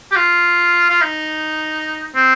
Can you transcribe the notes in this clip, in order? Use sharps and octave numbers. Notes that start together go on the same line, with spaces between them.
G4
F4
F4
D#4
C4